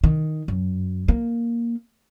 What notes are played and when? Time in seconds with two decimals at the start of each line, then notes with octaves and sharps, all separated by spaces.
0.04 D#3
0.48 F#2
1.08 A#3